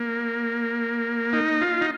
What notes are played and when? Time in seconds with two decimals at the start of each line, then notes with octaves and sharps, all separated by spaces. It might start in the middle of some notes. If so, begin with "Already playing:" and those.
Already playing: A#3
1.33 D#4
1.61 F4
1.81 D#4